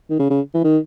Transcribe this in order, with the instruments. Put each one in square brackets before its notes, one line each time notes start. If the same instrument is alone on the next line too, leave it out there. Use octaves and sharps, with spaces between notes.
[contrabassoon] D#3
C#3
C#3
E3
D#3